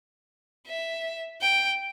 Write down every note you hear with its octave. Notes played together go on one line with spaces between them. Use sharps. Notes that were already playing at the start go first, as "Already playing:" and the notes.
E5
G5